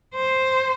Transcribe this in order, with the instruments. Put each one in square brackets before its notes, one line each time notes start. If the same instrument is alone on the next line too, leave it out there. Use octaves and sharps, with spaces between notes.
[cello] C5